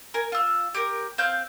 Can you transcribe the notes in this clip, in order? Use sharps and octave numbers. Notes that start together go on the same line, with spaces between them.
A#4 G#5
F4 E6
G4 A#4
C4 F5 G6